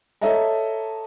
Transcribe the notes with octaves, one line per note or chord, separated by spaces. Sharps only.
A4 C#5 D#5 E5 A5 A#5